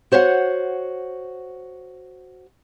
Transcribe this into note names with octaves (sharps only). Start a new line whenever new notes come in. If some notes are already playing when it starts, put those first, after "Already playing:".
F#4 C5 C#5 E5 F#5